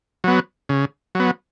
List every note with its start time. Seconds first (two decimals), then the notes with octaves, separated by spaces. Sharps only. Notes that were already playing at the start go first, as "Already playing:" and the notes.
0.24 F#3 B3
0.69 C#3
1.15 F#3 B3